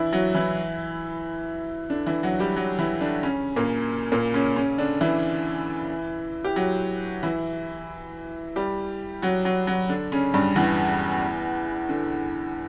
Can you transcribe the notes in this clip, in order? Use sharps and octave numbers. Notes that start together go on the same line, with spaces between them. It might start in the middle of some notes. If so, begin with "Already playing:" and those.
Already playing: E3 D4 E4
F#3 F#4
E3 E4
D3 D4
E3 E4
F#3 F#4
G3 G4
F#3 F#4
E3 E4
D3 D4
C#3 C#4
A#2 A#3
A#2 A#3
C#3 C#4
C#3 C#4
D3 D4
E3 E4
G4
F#3 F#4
E3 E4
G3 G4
F#3 F#4
F#3 F#4
F#3 F#4
D3 D4
C#3 C#4
G2 G3
E2 E3
D3